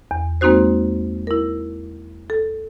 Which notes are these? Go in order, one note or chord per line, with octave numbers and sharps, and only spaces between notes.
E2
G#3 A#3 C4 D#4 F#4 C5
E4 A#4
A4